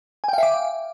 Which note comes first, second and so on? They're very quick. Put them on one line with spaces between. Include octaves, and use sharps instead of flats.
G#5 G5 F5 E5 D6